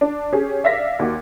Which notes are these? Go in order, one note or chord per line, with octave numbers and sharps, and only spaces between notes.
D4
C#4 G4 G#4
D5 E5 F5 A#6 B6
D#2 F#4 D6